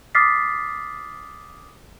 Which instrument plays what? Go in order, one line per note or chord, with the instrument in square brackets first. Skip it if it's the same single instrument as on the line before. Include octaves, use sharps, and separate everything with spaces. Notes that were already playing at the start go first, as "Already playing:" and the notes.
[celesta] D6 D#6 F6 A6 B6 C7